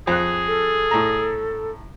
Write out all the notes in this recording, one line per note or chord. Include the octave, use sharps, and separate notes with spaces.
F2 G#4 F#6
A4
A2 A#5